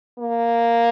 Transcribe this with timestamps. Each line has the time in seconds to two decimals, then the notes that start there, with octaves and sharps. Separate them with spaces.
0.18 A#3